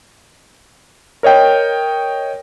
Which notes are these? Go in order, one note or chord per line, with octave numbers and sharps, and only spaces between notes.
A#4 C#5 D#5 G5